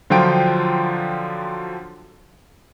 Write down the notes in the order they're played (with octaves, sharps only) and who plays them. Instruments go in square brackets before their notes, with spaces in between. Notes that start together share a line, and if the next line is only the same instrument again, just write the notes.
[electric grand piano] D3 F3 F#3 F4 G5 D7